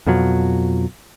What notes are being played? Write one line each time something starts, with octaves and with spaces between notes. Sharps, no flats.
F2 B2 F3 F#3